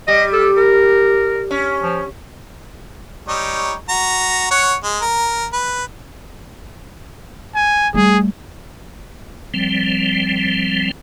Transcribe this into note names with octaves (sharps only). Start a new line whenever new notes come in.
G3 D#5
A4
A#4
C#4
F3
G3 D#4 C#5
F#4 A#5
C#5 F#5
G#3
A#4
B4
G#5
G3 A3 G#4
F3 G3 C4